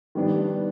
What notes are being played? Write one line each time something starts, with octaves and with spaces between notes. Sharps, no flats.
D#3 G3 B3 D4